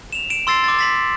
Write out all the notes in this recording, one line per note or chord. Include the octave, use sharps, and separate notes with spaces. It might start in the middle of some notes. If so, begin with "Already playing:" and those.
E7 F7
D7 E7
C6 E6 A6 C7
D6 A6
A6 B6 F#7